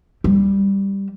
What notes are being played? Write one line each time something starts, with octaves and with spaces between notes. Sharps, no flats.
G3